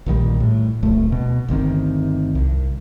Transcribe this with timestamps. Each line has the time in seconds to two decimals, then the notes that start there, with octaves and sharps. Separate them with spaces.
0.06 A#1 A#2 D#3 G3
0.40 A2
0.83 D1 C2 A3
1.12 B2
1.48 G1 D2 C3 D#3
2.35 C2